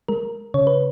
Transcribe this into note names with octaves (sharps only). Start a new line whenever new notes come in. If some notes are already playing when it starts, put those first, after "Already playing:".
G#3 A#4
C#3 C#5
B4